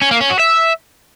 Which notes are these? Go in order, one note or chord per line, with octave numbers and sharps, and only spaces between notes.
C#4
A#3
C#4
F#4
E5